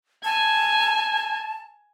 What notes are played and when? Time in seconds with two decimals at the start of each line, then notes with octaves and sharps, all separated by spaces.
0.24 G#5 A5